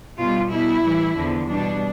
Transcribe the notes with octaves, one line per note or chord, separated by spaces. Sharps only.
B2 G3 F4
B2 G3 E4
A2 E3 G3
E2 D3 F3
B2 G3 D4